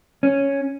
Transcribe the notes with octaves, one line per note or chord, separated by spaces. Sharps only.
C#4